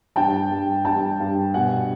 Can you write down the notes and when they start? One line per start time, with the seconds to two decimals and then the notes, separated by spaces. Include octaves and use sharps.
0.16 G2 G5 A5
0.50 G2
0.85 G2 G5 A5
1.20 G2
1.54 B2 F#5 G#5